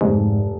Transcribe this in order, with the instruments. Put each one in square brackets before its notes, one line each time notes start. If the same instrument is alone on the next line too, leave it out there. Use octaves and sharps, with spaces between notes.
[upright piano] F1 [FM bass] G#2